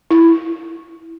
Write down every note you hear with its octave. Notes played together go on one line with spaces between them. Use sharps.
E4